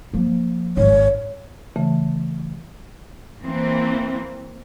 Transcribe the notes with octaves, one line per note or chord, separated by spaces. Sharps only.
F3 A#3
G#1 C#5
C#3 E3 A3
E3 A#3 C4